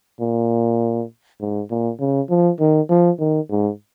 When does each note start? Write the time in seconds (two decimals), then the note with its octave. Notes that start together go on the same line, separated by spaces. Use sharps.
0.20 A#2
1.41 G#2
1.70 A#2
2.00 C#3
2.30 F3
2.60 D#3
2.90 F3
3.19 D#3
3.50 G#2